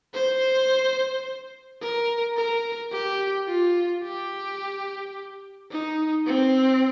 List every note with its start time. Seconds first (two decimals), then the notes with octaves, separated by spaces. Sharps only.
0.15 C5
1.82 A#4
2.37 A#4
2.92 G4
3.48 F4
4.04 G4
5.71 D#4
6.27 C4